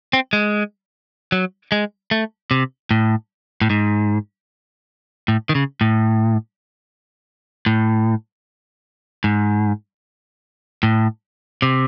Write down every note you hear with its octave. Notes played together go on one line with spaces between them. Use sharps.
C4
G#3
F#3
G#3
A3
C3
A2
A2
G#2
A2
D#3
C#3
A2
A2
G#2
A2
C3